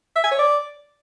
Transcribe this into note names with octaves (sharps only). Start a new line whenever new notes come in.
E5
G#5
C#5
D5